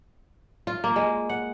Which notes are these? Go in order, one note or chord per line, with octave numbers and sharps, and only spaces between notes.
F4
A#3
G#3
F#5